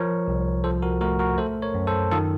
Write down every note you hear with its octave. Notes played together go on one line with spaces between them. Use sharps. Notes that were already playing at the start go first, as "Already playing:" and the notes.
Already playing: F3 A#4 C#5
C2
F3 A4 C5
F#4 A#4
A3 F#4 A#4
F#4 A#4
A3 A4 C5
A#4 C#5
F#2
A4 C5
D#3 F4 A4